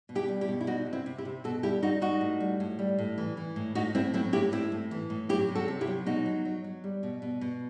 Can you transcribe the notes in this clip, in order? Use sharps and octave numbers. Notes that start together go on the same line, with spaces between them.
B2
E4 G4
G3
E4 G4
B2
E4
C3 D#4 F#4
C3
C4 E4
C3
E4 G4
C3
B2 F#4 A4
G3 E4 G4
G3 D#4 F#4
G3 D#4 F#4
A2
G3
A2
G3
A2
E3
E3
A2
A2 D#4 F#4
A2 C4 E4
F#3 C4 E4
A2 E4 G4
A2 C4 E4
A2
E3
A2
F#3 E4 G4
C3
F#4 A4
C3
E4 G4
F#3
B2 D#4 F#4
F#3
F#3
F#3
G3
B2
B2
B2